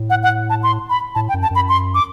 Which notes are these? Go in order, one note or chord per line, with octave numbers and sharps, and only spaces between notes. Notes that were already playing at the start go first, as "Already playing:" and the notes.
Already playing: A2
F#5
F#5
A5
C6
B5
A2 A5
G5
F#2
A5
F#2 B5
C6
D6